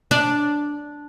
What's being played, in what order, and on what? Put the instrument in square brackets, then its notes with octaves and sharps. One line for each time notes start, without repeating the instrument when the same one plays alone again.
[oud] D4